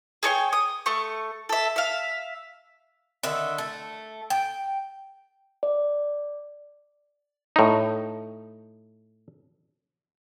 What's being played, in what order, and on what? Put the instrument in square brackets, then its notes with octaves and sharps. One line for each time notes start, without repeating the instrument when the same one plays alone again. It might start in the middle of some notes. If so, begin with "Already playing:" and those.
[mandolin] G#4 A4 C#5 G5
D#6
A3 C#6
A4 E5
E5 F5
[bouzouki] D3 D#3 E5
A3
G5
[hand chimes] D5
[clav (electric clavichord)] A2 D#4